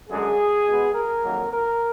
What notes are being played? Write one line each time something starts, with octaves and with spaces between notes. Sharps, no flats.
F#2 D3 G#3 G#4
B2 G#3 B3
A#4
F2 D#3 F#3 A#3
A#4